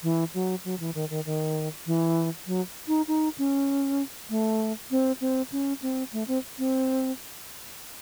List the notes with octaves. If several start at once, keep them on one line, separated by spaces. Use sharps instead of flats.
E3
F#3
F#3
E3
D#3
D#3
D#3
E3
F#3
D#4
D#4
C#4
A3
C4
C4
C#4
C4
A3
C4
C4